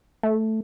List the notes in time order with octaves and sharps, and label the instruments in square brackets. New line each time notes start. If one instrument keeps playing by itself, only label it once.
[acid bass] A3